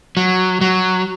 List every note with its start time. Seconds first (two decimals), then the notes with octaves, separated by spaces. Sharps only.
0.17 F#3
0.61 F#3